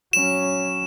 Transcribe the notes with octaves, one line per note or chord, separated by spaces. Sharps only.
F#3 C#4 E7